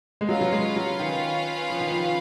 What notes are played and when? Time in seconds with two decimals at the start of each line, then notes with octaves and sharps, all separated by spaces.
0.21 G#3
0.29 F#3 C#4 F4 B4 F5
0.41 F#3
0.52 G#3
0.76 F#3
1.00 D#3
1.70 F3
1.80 D#3
1.91 F3